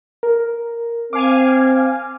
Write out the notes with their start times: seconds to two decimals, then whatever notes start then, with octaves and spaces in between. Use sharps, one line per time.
0.23 A#4
1.13 C4 F5 G#5 D6